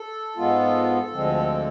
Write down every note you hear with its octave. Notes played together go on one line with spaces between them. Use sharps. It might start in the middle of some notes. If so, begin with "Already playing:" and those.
Already playing: A4
G#2 G#3 B3 F4
D2 D3 F3 G#3 C4